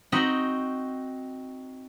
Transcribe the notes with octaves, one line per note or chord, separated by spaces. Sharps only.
C4 D#4 F#4 D#5 F#5 B5